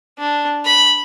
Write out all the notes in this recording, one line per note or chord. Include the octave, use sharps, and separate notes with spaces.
D4
B5